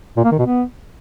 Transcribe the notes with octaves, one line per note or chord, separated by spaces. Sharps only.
A#2
A#3
D#3
B2
B3